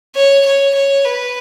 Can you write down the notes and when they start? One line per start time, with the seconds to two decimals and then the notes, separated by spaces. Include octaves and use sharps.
0.15 C#5
0.45 C#5
0.74 C#5
1.05 B4